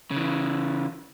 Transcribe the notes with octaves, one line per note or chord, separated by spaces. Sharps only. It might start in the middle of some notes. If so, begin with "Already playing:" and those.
C#3 E3